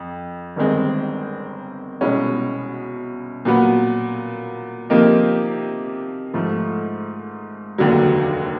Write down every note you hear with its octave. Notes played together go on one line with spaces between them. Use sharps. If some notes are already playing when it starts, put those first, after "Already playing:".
Already playing: F2
G1 G2 D#3 G#3 C4
C2 B2 G#3 C#4
A#2 F#3 B3
C3 F3 A#3 D#4 G4
G#2 F3 A3
F1 D#2 D3 F#3